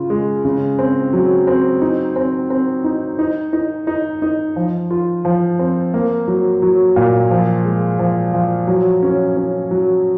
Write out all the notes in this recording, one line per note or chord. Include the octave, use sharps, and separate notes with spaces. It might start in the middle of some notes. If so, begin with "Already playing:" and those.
Already playing: C#3 C#4 F4
G#3
C#3
C4
F#3
C4
D#4
C4
C4
D#4
D#4
D#4
D#4
D#4
F3
F4
F3
C4
A#3
F#3
F#3
A#2
F3
G#3
F3
F3
F#3
C#4
C#4
F#3